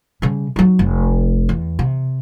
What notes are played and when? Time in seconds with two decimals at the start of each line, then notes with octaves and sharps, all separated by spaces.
0.22 C#3 G3
0.56 F#3 D#4
0.79 F1
1.49 E2
1.79 C3